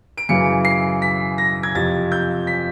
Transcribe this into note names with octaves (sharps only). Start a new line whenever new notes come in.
D7
F#2 C#3 E3 C#7
C7
B6
A#6
G#6
F2 C3 F3 A6
G6
B6